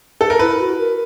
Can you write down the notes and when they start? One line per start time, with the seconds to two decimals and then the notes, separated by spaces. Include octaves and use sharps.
0.21 A4
0.30 A#4
0.39 E4 B4
0.59 F#4
0.79 A#4